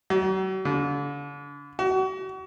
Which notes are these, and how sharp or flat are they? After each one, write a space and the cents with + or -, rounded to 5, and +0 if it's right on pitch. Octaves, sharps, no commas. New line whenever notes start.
F#3 +40
D3 -40
F#4 +35